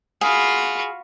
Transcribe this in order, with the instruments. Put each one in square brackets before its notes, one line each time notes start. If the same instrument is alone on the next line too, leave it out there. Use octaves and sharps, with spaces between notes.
[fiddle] F4 F#4 [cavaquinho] G#4 [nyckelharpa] F5 B5